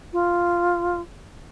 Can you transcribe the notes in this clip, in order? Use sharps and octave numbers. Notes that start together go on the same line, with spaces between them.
F4